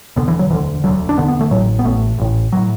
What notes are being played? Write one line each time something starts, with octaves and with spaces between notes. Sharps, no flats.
E1 D2 D3 B3
E3
F#3
E1 D2 D3 E3
E1 D2 D3 F#3
D4
E1 D2 D3 B3
B3
A3
A1 A2 F#3
B3
A1 A2 A3
A1 A2
A2 F#3